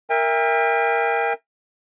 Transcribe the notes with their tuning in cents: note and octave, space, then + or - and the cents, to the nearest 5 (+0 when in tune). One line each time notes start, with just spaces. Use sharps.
A#4 +0 E5 +0 G5 +45